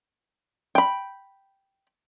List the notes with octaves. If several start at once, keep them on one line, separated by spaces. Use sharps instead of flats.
G5 B5